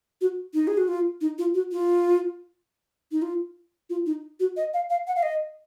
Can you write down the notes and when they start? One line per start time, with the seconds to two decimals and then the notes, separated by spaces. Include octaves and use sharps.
0.21 F#4
0.54 D#4
0.67 G#4
0.78 F#4
0.88 F4
1.21 D#4
1.38 F4
1.54 F#4
1.72 F4
3.12 D#4
3.22 F4
3.90 F4
4.06 D#4
4.40 F#4
4.57 D#5
4.74 F5
4.90 F5
5.07 F#5
5.16 F5
5.23 D#5